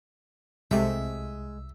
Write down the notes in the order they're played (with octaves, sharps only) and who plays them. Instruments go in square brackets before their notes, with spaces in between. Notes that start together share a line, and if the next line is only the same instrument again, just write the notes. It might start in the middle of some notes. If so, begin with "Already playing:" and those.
[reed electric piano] C2 [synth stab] C3 A3 [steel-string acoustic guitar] G#3 [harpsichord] E5